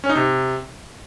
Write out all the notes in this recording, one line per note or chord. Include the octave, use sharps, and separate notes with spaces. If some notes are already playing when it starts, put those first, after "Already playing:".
C#4
D#4
C3